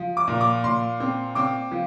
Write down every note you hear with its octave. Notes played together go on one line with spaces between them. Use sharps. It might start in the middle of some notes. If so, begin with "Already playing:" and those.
Already playing: F3
D6
A#2
D6
A#2 C6
C4
C4 D6
F3